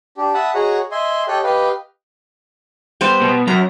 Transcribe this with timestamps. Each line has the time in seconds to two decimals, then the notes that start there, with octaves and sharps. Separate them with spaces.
0.17 D4 G4
0.34 E5 F#5 A5 B5 D#6
0.55 F#4 G#4 C#5 D#5 F#5 A#5
0.91 D#5 E5 G#5 C6
1.28 G4 A4 C#5 D#5 G5 F#6
1.44 G4 B4 D#5 F5 G5
3.01 G3 B3 C5
3.22 B2
3.47 F#2 A#5